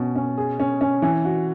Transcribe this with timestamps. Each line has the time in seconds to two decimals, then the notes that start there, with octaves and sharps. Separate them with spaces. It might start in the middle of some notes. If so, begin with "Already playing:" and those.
Already playing: B2 C#4
0.16 C#4
0.37 G#4
0.60 C#4
0.81 C#4
1.02 E3
1.25 F#4